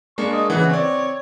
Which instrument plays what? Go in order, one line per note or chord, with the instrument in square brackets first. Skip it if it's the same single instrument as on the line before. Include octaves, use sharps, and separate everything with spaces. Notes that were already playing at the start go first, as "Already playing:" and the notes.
[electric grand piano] G#3 A#3 D4 [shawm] C#6
[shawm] D#5
[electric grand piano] C#3 E3 [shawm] F#5
[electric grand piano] C4 D5 [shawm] C#5